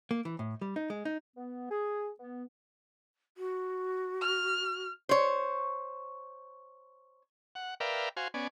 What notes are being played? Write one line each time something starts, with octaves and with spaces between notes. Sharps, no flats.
A#3
E3
A2
G3
D#4
G#3
D#4
B3
G#4
B3
F#4
F6
C5 C#5
F#5
A#4 B4 D5 E5 F5 G5
F#4 C5 F5 G#5
B3 C#4 D5 G#5